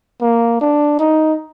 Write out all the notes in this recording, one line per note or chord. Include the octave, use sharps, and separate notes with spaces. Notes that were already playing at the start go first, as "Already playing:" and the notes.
A#3
D4
D#4